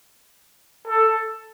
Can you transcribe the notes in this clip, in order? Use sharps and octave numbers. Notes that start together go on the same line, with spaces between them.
A4